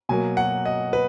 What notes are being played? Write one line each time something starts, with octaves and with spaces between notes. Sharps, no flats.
B2 F#3 A#3 G#5
F#5
D#5
B4